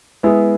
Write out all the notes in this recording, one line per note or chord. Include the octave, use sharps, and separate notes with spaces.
G#3 B3 E4 G#4